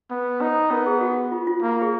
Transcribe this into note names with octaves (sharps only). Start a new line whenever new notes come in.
B3
D#4 B4
B3 A#4
G#4
F#4
F4
F4
A#3
G#4